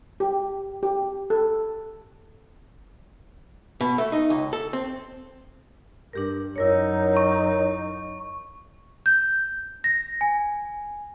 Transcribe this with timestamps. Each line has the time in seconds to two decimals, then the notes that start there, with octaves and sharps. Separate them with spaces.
0.20 G4
0.83 G4
1.30 A4
3.81 B2
3.98 A3
4.12 D#4
4.30 C#2
4.53 A4
4.73 C4
6.13 G2 D4 G4 A#4
6.56 F#2 D#4 E4 A#4 C#5
7.17 C#6
9.06 G6
9.84 A#6
10.21 G#5